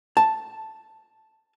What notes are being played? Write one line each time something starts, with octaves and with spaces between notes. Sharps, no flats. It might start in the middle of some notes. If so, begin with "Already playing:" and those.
A5